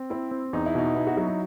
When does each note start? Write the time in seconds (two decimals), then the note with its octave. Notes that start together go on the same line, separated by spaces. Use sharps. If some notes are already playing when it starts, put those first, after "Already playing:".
Already playing: C4
0.10 C4 E4
0.31 C4
0.53 E2 D#4
0.66 E4
0.75 B2 D#4
0.95 B3 E4
1.07 F#4
1.17 F#3 F#4
1.28 D#4